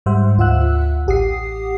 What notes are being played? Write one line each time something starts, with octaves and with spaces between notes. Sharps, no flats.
G#2 G3 C5 E5 F#5
D2 F4 E5 F#5 E6 F#6
A1 G4 F#5 D#6 C7